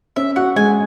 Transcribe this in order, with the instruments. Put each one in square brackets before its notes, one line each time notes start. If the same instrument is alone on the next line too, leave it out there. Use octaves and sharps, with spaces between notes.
[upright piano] C#4 [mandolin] E5
[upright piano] F#4 [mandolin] F#5
[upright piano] G#3 [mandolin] G#5